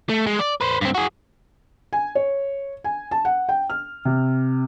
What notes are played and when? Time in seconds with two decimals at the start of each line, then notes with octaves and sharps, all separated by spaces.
0.09 A3
0.27 G#3
0.39 D5
0.61 B4 C5
0.81 G2 C4
0.95 F#4 G#4
1.93 G#5
2.15 C#5
2.84 G#5
3.11 A5
3.25 F#5
3.49 G5
3.70 F6
4.05 C3